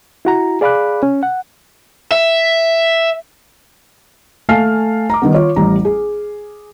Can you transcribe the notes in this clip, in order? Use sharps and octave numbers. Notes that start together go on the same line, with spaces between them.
E4 F#4 A#5
G#4 D5 F5 B5 D6 F#6
C#4
F#5
E5
A3 F5 G#5 A5 F6 C7
A#5 D6
D#3 G3 B3
F4 C#5
A1 G3 A#5
G#4